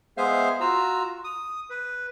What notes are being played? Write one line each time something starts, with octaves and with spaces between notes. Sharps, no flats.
G#3 B3 G#4 C5 E5 F5
F4 F#4 A#5 E6
D#6
B4